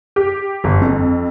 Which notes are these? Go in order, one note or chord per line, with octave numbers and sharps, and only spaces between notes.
G4
G1
F2